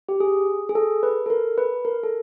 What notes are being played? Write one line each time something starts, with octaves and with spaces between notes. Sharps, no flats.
G4
G#4
G#4
A4
B4
A4
A#4
B4
A#4
A4